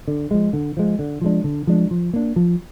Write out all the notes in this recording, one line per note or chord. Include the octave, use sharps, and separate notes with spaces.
D3
F3 G#3
D3
F3 G#3
D3
F3 G#3 D4
D3
F3 G#3 D4
F3
A#3 D4
F3